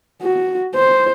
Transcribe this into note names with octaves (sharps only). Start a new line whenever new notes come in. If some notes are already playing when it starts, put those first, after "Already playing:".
F#4
C5